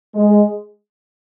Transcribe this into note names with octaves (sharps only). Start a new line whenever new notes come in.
G#3